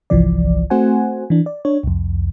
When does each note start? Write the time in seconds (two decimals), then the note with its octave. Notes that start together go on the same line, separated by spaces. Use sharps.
0.10 G1 C2 E3 F3 D5
0.70 A3 C4 F#4 C5 F#5 G#5
1.30 E3 D4
1.46 D5
1.65 D4 C#5
1.83 C2 F2